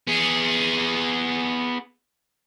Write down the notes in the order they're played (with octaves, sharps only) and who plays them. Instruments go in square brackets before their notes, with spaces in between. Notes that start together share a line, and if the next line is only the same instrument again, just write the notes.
[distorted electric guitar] B3 G#4